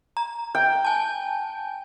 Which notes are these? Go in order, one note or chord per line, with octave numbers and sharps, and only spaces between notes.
A#5
G5
G#5 A5